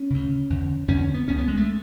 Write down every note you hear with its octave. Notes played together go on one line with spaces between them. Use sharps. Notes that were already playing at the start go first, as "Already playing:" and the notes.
Already playing: C#4
D2 C#3
E2 D3
E2 D3 C#4
C#4
B3
C#2 C#3 C#4
B3
G#3
A3